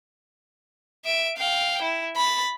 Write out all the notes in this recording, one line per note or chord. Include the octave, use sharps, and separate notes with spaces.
E5 D7
F5 G5
E4
B5 A6